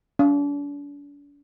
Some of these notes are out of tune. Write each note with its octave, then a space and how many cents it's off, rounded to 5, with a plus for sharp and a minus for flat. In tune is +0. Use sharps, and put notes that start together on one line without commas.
D4 -40